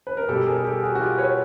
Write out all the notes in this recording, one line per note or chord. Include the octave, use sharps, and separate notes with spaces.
B4
A#4
B2 G3 G4 A4
G#4 A#4
G4 A4
F#4 G#4
F#4
F4 G4
B4 C#5